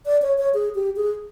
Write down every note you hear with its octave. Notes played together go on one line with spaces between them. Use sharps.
D5
C#5
C#5
G#4
G4
G#4